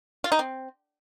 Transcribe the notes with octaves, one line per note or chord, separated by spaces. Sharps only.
F4
D#4
C4